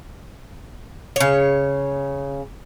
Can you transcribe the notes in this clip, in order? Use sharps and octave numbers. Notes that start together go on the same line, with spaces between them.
C#3 C#5